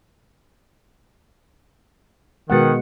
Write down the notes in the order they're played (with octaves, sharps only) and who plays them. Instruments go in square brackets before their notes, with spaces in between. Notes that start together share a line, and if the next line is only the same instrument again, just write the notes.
[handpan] B2 G#3 F#5 [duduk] D#3 [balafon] B3 F#4 B4